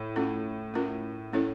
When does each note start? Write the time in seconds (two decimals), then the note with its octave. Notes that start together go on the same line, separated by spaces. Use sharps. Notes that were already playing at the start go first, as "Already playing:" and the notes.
Already playing: A2
0.16 A3 C#4 F4 A4
0.74 A3 C#4 F4 A#4
1.32 A3 C#4 E4 A4 C#5